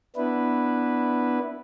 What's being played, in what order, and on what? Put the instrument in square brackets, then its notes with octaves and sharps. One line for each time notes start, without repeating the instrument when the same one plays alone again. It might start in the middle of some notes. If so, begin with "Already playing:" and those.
[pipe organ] B3 D4 E4 B4